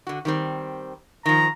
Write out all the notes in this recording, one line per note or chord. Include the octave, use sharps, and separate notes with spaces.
D3 F#4
D#3 G3 C4
D#3 F3 A#5